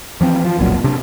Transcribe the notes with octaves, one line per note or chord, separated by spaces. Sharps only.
E3 F3 C4
F3
F1 B1 A#2 F#3
C3 D4